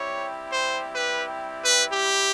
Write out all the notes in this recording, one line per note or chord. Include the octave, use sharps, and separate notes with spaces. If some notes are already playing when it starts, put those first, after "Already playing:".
Already playing: G3 C4 E4 G4 C#5
C5
B4
B4
G4